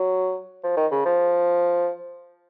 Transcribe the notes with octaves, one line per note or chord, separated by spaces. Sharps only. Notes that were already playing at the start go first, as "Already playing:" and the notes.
Already playing: F#3
F3
D#3
C#3
F3